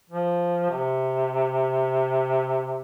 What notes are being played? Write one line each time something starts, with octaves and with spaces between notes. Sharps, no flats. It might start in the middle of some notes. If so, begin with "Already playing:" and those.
F3
C3